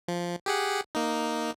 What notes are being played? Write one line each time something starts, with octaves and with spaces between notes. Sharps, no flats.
F3
G4 G#4 F#5
A#3 D#4